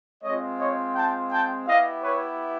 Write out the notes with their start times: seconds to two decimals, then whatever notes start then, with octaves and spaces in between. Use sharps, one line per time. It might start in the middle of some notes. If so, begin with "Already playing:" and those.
0.23 G#3 C4 F4 C#5 D#5
0.60 C#5 D#5
0.95 G5 A5
1.31 G5 A5
1.67 B3 E4 G4 D#5 F5
2.03 B4 C#5